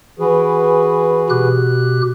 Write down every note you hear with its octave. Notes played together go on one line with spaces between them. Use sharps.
E3 F#4 G#4 B4
B2 G4 F#6